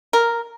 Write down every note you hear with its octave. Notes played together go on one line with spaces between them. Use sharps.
A#4